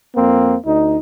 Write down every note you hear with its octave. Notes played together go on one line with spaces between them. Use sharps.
F2 A#3 C4
D2 D#4